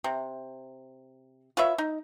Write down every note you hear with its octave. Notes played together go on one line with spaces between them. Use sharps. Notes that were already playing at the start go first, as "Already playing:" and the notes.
C3
F4 B4 C#5 E5
D#4